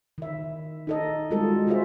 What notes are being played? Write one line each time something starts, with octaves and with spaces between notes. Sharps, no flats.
D#3 E5
D#4 A4 D#5
G3 G#3 F4 F#4 A4
F4 F#4 G#4 A4 C5 E5